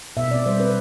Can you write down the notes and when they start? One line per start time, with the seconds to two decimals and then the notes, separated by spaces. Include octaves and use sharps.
0.17 B2 E5
0.31 C4 D5
0.46 G3 C5
0.59 C4 B4